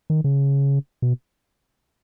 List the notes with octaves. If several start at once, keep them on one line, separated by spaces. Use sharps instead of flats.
D#3
C#3
B2